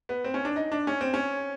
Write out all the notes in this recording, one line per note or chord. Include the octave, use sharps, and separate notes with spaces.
B3
C4
C#4
D4
D#4
D4
C#4
C4
C#4